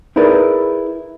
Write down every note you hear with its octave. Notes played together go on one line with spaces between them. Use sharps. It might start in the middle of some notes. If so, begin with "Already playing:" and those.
D#4 E4 G#4 A#4 B4 D5